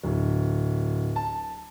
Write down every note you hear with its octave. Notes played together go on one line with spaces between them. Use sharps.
D1
A5